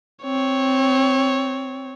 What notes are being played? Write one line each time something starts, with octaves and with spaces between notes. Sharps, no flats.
C4 C#5